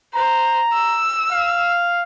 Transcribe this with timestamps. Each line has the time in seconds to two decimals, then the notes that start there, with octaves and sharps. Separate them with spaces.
0.15 C5 A#5
0.73 E6
1.31 F5